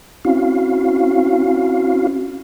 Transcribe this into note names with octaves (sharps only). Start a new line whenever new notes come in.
C4 C#4 E4 F#4 F5